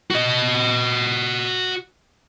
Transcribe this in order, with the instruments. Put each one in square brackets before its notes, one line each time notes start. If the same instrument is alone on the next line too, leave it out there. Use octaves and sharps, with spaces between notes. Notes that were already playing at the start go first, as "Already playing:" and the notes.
[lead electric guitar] F#4 D#5